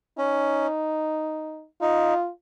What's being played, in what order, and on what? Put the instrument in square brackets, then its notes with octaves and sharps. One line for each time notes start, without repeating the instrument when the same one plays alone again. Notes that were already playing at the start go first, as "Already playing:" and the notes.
[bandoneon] C#4 [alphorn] D#4
[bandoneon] D#4 [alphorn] F4